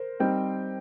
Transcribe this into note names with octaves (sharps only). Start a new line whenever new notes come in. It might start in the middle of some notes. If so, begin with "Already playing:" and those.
Already playing: A#4 C5
G3 C4 D#4 G5